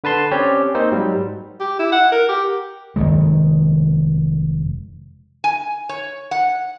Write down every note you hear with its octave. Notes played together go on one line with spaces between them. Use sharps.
D3 B4 A5 C6
C4 C#4 G4 C#5 D5
A#3 C4 D#4 C5
G#2 F#3 G3
G4
E4
F#5
A#4
G4
F1 C2 D#3 G#3
G#5
C#5
F#5